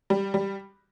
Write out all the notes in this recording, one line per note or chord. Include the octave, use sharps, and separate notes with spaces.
G3
G3